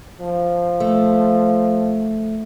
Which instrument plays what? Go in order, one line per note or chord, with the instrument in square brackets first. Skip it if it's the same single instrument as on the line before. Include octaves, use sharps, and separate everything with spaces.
[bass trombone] F3
[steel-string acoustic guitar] A3